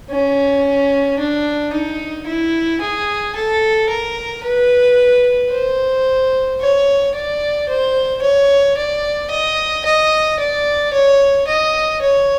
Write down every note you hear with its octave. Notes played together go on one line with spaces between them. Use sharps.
C#4
D4
D#4
E4
G#4
A4
A#4
B4
C5
C#5
D5
C5
C#5
D5
D#5
D#5
D5
C#5
D#5
C#5